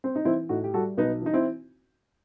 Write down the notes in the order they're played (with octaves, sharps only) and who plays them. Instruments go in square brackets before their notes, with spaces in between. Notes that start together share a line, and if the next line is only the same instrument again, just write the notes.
[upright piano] C4
D#4
E3 C4 E4
A2 D#4 F#4
G4
G3 F#4 A4
B1 B3 D#4
E3 D#4
C4 E4